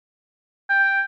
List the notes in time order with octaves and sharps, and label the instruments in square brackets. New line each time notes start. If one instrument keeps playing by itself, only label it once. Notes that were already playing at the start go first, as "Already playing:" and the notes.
[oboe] G5